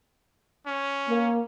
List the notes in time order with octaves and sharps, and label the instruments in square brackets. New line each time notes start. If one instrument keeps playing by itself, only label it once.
[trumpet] C#4
[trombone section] A#3